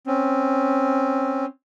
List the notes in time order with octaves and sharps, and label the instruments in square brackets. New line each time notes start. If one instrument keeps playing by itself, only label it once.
[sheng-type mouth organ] C4 C#4